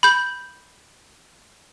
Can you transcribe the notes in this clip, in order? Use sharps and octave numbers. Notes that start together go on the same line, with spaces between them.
B5 G6 F#7